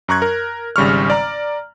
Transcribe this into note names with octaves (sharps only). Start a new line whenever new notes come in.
F#2 A#5 C#6 F#6 G#6
A#4
G#1 C#3 G3 C#6 F6
D5 A#5